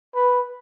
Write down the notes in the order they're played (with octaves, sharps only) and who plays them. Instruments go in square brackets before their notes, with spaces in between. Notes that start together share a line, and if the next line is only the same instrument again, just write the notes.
[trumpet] B4